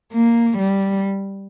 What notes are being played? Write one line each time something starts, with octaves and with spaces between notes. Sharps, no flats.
A#3
G3